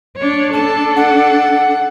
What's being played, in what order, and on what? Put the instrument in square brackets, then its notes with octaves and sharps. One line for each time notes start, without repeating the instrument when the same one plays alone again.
[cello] D4 C#5
[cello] D4 A4 [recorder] A5
[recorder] F#5